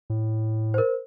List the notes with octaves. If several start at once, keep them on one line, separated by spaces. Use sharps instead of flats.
A2
A#4 C5